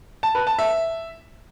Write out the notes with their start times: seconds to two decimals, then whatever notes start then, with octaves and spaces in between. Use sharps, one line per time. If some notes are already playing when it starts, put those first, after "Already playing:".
0.23 A5
0.35 B4
0.47 A5
0.59 E5